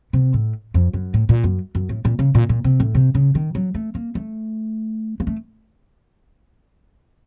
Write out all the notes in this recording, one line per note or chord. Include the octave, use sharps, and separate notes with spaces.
C3
A2
F2
F#2
A2
A#2
F#2
F#2
A2
A#2
C#3
A#2
A#2
C3
A2
C3
C#3
D#3
F#3
A3
A#3
A3
A#3
A3